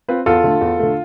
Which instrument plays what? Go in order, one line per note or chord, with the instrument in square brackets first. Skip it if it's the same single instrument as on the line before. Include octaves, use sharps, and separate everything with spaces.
[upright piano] C4 F4 B4
[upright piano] E2 [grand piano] F4 A4
[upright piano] D3 A3
E2
D3 A3